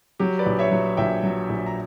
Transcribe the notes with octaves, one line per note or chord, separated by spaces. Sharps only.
F#3 G4
B4 D5
A#1
C#5 E5
F#3
A#1 E5 G5
F#3
A#1
A#5